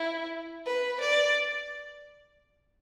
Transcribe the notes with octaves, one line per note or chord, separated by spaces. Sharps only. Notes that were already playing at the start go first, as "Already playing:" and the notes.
Already playing: E4
B4
D5